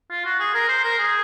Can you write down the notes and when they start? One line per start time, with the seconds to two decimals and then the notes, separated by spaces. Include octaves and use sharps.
0.10 F4
0.25 F#4
0.40 G#4
0.54 A#4
0.68 C5
0.83 A#4
0.98 G#4